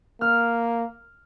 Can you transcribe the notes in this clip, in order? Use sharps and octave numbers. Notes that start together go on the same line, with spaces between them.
A#3 F6